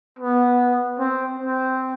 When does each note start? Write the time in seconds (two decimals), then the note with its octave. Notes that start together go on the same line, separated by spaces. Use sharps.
0.19 B3
0.99 C4
1.39 C4